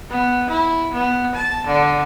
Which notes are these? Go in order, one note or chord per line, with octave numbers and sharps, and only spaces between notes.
B3
E4
B3
A5
D3